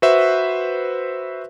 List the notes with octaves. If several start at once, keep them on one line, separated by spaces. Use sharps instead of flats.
F#4 B4 C5 E5